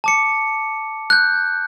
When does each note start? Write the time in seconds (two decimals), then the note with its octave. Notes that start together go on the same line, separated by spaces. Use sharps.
0.04 A5 D6 C#7
1.10 F#6 G6